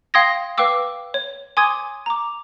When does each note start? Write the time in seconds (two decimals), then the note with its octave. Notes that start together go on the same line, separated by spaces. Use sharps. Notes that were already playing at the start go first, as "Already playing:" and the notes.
0.14 F5 G5 C6 D#6 G#6 A#6
0.58 B4 F5 G5 D6 E6
1.14 C#5
1.57 G#5 C6 D6 D#6 G#6 D#7
2.06 A#5 D6